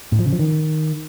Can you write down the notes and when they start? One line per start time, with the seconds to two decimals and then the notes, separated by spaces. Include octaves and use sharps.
0.12 A2
0.19 F3
0.26 C#3
0.33 F3
0.39 D#3